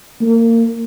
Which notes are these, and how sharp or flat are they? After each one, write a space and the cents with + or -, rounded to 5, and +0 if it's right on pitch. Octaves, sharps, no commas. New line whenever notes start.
A#3 -25